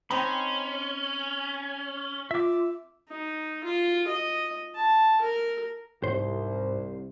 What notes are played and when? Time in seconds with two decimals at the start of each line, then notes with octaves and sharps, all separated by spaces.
0.11 C4 C#4 D#4 B5 C6
2.31 F4 E5 D6
3.08 D#4
3.64 F4
4.08 D#5
4.75 A5
5.21 A#4
6.04 C2 G#2 C5